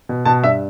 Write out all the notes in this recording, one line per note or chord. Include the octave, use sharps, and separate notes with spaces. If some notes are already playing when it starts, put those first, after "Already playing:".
B2
B2 A5
G2 E5